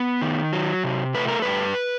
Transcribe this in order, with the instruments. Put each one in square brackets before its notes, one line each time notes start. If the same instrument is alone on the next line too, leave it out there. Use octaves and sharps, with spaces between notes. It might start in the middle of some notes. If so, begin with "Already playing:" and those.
Already playing: [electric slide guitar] B3
D#3
F#3
C3
A3 B4
A#4
G2 B4